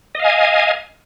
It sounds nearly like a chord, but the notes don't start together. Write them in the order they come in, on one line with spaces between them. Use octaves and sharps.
D#5 F5 G#5